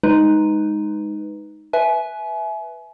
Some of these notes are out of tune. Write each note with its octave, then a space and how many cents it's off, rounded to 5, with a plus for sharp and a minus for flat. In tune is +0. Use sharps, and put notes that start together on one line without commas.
G#3 +0 D#4 +0 B4 +0
B4 +0 E5 +0 G#5 +35